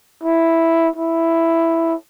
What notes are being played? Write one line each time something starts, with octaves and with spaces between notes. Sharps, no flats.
E4
E4